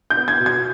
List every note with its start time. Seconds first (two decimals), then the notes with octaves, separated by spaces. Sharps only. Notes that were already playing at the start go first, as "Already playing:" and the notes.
0.10 G6
0.17 B3
0.28 G#6
0.40 B2
0.46 G#6